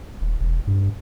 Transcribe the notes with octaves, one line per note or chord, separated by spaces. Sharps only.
D#1
E1
G2